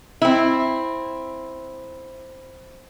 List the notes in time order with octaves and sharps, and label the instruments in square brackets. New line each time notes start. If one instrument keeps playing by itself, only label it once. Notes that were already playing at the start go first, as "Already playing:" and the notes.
[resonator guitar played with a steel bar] C4 E4